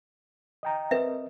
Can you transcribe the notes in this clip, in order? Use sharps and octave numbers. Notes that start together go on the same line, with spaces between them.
D#5 G5 A#5
C4 A#4 B4 D#5 E5